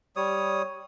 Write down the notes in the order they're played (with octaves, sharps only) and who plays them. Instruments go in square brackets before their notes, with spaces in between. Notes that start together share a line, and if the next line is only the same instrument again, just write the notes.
[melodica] G3 C#5 D#6